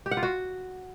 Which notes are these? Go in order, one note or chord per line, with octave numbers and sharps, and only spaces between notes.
G4
F#5
F4
F#4